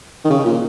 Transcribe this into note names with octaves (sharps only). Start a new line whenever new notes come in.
D#3
C#3
A#2